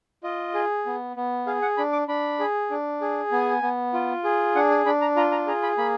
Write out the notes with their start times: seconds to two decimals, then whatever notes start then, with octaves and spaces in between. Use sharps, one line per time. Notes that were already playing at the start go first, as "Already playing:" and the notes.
0.24 F4 D#5
0.54 G#4
0.86 B3
1.17 B3
1.47 G#4 F5
1.62 F#5
1.77 D4 B5
1.93 D6
2.08 D4 B5
2.39 G#4
2.71 D4
3.01 G#4
3.32 B3 G#5
3.62 B3
3.93 F4
4.24 G#4
4.55 D4 F#5
4.71 G#5
4.86 D4 B5
5.01 A#5
5.16 F4 A#5
5.31 A#5
5.47 G#4 A#5
5.63 B5
5.78 A#3 B5